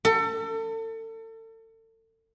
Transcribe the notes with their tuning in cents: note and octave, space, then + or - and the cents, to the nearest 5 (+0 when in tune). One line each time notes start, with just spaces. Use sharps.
A4 +35